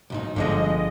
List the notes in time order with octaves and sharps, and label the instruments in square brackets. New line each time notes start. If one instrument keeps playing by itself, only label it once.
[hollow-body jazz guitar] B1 G#2 D#4
[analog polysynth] G1 D#5 [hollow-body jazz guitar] D3 F3 G#3